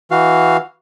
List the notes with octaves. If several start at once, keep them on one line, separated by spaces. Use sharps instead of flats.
E3 F#4 F5